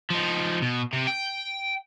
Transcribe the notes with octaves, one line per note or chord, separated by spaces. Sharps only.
F3 D#4
B2
C3
G5